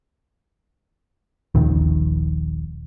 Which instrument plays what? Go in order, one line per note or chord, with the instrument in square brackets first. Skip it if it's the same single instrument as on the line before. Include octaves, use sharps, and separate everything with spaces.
[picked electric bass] D#1 A#1 D#3